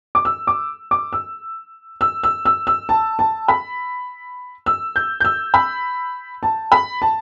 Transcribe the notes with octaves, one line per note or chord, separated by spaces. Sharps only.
D6
E6
D6
D6
E6
E6
E6
E6
E6
A5
A5
B5
E6
G6
G6
E6
B5
A5
B5
A5